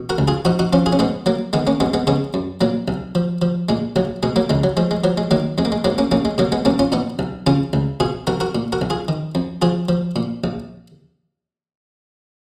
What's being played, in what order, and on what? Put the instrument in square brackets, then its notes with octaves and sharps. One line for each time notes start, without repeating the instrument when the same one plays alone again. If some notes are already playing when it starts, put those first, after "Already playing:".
Already playing: [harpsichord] B2
F#4 A#4
C#2
F4 G#4
F3 D#4 F#4
D#4 F#4
F3 C#4 F4
F4 G#4
C#4
G#2 G#3 B3
F#3 A#3
D#3 G#3 B3
A#3 C#4
F#2 G#3 B3
G#3 B3
C#3 G#3 B3
F#2
A#2 F#3 A#3
B1
F3
F3
A#2 G#3
A#1 F#3
B2 G#3
F#3 A#3
C#2 G#3
F#3
F3 G#3
G#3
F3 F#3
G#3
D#3 F#3 A#3
F2 G#3
A#3
G#3
G#2 F#3 A#3
A#3 C#4
A#1 A#3 C#4
G#3
B2 F#3 A#3
G#3 B3
B1 A#3 C#4
C#4 F4
A#2 B3 D#4
B1
C#3 C#4 F4
C#2
B2 F4 G#4
B1 F#4 A#4
F#4 A#4
A#2
F#4 A#4
B1
F4 G#4
D#3
F2
F3 F4 G#4
F3
A#2
A#1